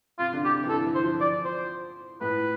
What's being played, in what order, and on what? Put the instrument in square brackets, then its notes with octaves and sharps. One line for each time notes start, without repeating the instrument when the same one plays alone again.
[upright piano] C3 [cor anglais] F4
[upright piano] D3
[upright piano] C3 [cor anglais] G4
[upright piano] E3
[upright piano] D3 [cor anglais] A4
[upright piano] E3
[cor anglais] C5
[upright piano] F3
[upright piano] F3 [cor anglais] D5
[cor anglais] C5
[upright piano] A2 [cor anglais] B4